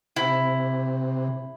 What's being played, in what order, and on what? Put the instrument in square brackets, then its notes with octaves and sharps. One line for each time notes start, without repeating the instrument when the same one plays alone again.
[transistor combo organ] C3 [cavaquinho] E4